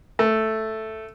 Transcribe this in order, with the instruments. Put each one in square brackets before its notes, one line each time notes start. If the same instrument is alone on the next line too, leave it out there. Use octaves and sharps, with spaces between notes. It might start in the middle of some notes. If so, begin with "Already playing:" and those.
[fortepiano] A3